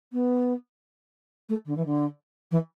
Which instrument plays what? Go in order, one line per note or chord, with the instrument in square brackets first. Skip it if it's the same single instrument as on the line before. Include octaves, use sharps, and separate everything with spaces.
[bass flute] B3
A3
D3
E3
D3
E3